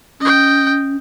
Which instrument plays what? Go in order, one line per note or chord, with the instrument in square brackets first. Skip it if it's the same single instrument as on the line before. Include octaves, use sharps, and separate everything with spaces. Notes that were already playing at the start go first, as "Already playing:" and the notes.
[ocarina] C#4 [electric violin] D#5 G5